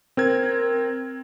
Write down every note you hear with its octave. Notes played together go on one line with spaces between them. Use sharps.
C4 A#4 G#6